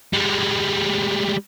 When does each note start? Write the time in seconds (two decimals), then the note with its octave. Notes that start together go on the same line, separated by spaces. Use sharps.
0.13 G3 G#3